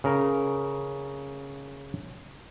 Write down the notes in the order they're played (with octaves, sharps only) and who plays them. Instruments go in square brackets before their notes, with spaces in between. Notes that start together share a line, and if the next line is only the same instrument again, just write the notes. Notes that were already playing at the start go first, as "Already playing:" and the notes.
[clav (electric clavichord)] C#3 A#4